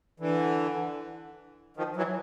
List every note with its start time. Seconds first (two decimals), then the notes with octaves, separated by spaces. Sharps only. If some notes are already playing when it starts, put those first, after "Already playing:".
0.20 D3 E3
1.77 D#3 F3
1.96 E3 F#3